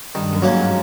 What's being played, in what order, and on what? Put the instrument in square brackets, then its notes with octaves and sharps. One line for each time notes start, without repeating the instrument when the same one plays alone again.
[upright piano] G2 [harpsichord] D#3
[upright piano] F#2
[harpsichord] F#3 A#3 C#4
[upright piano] G#2